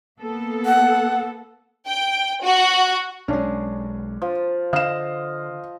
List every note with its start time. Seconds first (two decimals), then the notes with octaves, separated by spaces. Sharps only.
0.19 A#3 B3 A4
0.66 F#5
1.87 G5
2.44 F#4
3.28 B1 G#3 C#4 D4
4.22 F3
4.73 D3 D#5 F5 E7